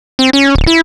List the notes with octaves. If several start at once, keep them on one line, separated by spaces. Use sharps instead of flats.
C4
C#4
D1
E4